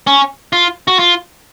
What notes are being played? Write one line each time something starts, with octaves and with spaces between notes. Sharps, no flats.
C#4
F4
F#4
F4